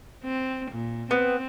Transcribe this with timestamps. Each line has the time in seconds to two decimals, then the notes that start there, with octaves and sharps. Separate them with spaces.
0.24 C4
0.71 A#2
1.11 B3 C4